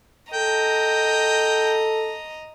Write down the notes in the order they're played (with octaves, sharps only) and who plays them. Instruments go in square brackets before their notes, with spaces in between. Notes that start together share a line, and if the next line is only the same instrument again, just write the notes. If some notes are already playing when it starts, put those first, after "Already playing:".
[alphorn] A4 [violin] D#5 A#5 [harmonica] G5